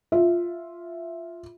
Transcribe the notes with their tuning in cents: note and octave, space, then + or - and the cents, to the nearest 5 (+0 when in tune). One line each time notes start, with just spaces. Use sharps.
F4 +0 E5 +0